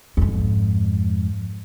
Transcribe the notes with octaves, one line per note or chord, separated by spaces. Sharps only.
F2 G#2